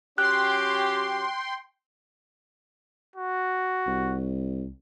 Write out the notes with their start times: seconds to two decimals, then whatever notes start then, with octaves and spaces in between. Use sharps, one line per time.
0.18 F#3 C#4 G4 G5 C6 F#6
3.16 F#4
3.87 C2